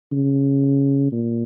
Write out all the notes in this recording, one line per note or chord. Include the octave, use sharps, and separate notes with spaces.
C#3
A#2